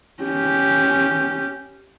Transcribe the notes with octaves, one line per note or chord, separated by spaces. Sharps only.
C#4 G4